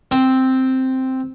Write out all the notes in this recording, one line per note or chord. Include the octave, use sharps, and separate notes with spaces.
C4